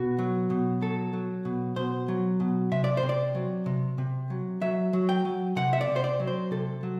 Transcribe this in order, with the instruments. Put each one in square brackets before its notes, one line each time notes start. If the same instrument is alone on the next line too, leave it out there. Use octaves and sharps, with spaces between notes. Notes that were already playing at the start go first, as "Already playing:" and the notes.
Already playing: [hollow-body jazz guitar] B2 F#4
F#3
B2
F#3 A4
F#3
B2
B2 C5
F#3
B2
C3 E5
D5
C5
C3
D5
F#3
C3
C3
F#3
F#3 E5
F#3
G5
F#3
C3 F#5
E5
D5
C3
C5
D5
F#3
C5
C3 A4
F#3